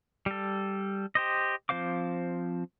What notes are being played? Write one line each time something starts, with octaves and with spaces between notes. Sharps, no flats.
G3 A4
G4 C5 D#5
F3 C4 C5 F5 D6